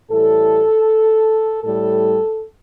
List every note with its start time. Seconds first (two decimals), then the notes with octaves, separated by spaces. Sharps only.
0.11 A2 E3 G3 A4
1.63 A2 G3 A4